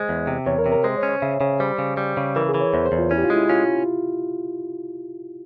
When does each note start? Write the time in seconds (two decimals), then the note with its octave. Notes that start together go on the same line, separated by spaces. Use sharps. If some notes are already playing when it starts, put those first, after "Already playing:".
Already playing: G#3 C5
0.09 E2
0.27 C3
0.46 E2 C#5
0.58 A#4
0.66 C3
0.72 A#4
0.84 G#3 C5
0.97 C#5
1.03 C#4
1.09 C#5
1.22 C#3 E5
1.41 C#3 C#5
1.60 G3 C5
1.78 C#3
1.97 G3
2.17 C#3
2.36 E3 A#4
2.49 G#4
2.54 E3
2.61 C#5
2.74 E2 C5
2.86 C5
2.92 E2
2.98 F4
3.11 C#4 E4
3.18 G4
3.24 F4
3.30 G#3
3.36 E4
3.49 C#4 F4